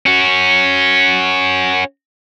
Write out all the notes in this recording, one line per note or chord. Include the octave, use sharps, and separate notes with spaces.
C#4 F#4